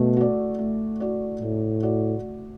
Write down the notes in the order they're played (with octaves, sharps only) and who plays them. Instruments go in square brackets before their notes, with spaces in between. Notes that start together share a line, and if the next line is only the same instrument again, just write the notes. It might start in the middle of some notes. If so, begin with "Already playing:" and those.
Already playing: [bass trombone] B2 [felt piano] A3
[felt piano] F#4 D5
A3
F#4 D5
[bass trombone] A2 [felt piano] A3
[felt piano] F#4 D5